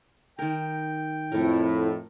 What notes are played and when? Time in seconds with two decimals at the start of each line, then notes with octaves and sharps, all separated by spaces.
0.39 D#3 A#4 G5
1.32 F2 A2 A3 E4 A#4